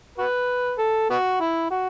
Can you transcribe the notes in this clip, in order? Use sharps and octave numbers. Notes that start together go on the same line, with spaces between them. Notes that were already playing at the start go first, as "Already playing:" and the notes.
F#4 B4
A4
B3 F#4
E4
F#4